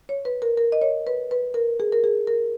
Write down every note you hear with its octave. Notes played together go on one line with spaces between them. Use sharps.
C#5
B4
A#4
A#4
D#5
C#5
B4
B4
A#4
G#4
A#4
G#4
A#4